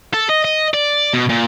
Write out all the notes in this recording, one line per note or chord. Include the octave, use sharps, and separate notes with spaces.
A4
D#5
D#5
D5
B2
A#2